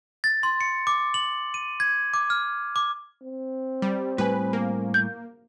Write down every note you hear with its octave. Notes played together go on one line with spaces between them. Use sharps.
A6
C6
C#7
D6
F#7
D#7
G#6
D6
F6
D6
C4
G3
A2 G3 B4 G#5
A#3
G6